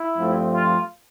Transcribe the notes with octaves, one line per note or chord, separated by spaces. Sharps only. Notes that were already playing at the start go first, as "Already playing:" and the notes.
Already playing: E4
G2 F3 A3 C4
F4